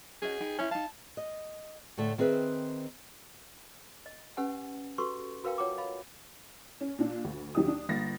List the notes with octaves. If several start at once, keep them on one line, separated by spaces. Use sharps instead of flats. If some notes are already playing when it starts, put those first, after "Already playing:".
C#4 F#4 G#4 D#5
D#4 G5 B5
C#4 E4 B5
D#4 F5 A5
D#5
A2 D3 A3
D#3 C4 G#4 B4 E5
D#5
C#4 G4 B4 F#5 G#5
F#4 G4 A4 B4 C6 C#6
F#4 A#4 B4 F5 G5 A5
F4 C#5 F#5 G5 A#5 D6
D#5 F5 B5
C#4
A#2 D4
D2
D#2 F#3 D#4 G4 D#6
D4
G1 A#3 A6 A#6